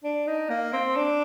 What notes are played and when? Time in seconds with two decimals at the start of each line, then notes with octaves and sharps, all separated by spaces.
0.04 D4
0.27 D#4
0.50 A#3
0.73 C4
0.96 D4